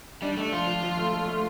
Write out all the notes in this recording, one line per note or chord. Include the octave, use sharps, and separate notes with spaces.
G3 D4
A3 D4
F3 F4
F3
F3
A3
A3
A3